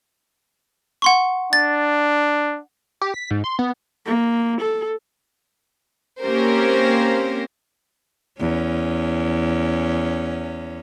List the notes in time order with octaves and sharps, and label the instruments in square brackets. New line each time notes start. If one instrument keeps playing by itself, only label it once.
[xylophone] F#5 C6 C#6
[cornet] D4 [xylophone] A6
[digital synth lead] G4
B6
G#2
C6
B3
[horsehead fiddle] A#3
A4
[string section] A#3 C4 C#4 G4 A#4 C5
[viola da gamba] E2 C#4